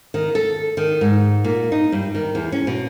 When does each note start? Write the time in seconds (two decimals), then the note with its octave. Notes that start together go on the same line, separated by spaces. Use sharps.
0.14 D#3
0.35 A4
0.77 D#3
1.01 G#2
1.44 A#2
1.72 D#4
1.92 G2
2.15 D#3
2.35 E2
2.52 C#4
2.67 B2